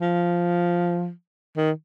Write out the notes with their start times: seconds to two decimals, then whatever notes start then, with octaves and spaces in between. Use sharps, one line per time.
0.01 F3
1.57 D#3